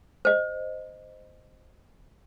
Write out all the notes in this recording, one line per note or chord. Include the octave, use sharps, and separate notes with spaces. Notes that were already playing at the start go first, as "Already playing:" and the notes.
C5 D#5